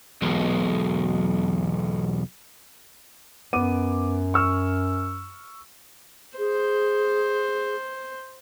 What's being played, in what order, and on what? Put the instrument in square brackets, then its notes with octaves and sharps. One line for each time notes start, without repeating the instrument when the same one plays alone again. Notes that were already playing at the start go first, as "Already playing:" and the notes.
[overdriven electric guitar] B1 E2
[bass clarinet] F#2 [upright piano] B3 D6 D#7
[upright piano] C#6 E6 F6
[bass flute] G#4 [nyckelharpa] C5